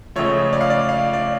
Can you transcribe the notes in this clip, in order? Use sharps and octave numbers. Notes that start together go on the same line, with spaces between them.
C#2 C#3 F3 A3 C#5
D5
F5
D5
F5
D5